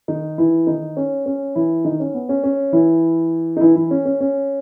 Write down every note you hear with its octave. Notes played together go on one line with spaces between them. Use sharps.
D#3 D#4
E3 E4
D#3 D#4
C#4
C#4
E3 E4
D#3 D#4
C#4
B3
C#4
C#4
E3 E4
D#4
E3 E4
E3 E4
C#4
C#4
C#4